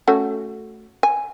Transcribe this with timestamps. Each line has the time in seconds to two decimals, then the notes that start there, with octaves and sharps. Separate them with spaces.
0.08 A3 C#4 F#4
1.03 G#5